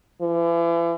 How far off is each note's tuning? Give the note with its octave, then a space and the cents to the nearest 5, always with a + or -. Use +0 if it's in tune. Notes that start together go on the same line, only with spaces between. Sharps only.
E3 +40